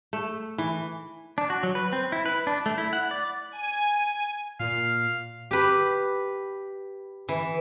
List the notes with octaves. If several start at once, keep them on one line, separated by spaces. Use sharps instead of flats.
A3
E3
D4
F#4
F#3
B4
C4
E4
B4
D4
A3
E4
F#5
D5
G#5
A#2 F5
G4 B4
E3